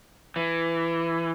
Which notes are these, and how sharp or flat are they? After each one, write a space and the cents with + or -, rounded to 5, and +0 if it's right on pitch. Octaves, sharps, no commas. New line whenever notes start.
E3 +15